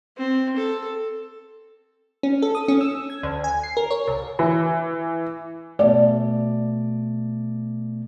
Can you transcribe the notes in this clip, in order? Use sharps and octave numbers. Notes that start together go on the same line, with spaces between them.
C4
A4
C#4
A4
D#6
C#4
E6
G#6
D2
G#5
C7
A#4
C#5
C2
E3
B2 A3 D5